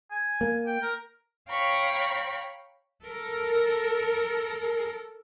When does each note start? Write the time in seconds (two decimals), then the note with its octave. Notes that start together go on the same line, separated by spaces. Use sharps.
0.11 G#5
0.41 A#3
0.67 G5
0.82 A#4
1.50 C#5 F5 G5 A#5 B5 C#6
3.03 A4 A#4